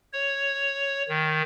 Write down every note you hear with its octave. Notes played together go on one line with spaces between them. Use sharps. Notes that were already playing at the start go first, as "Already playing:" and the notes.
C#5
D#3